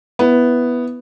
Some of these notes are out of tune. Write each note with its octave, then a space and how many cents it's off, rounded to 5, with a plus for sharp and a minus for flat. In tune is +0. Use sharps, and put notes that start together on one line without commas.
B3 +0 E4 +0